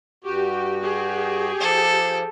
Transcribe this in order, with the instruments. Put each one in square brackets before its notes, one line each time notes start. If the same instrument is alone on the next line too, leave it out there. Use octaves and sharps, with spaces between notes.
[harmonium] G2 F#4 [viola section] G4
[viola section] G4 G#4
[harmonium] F3 [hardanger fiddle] A4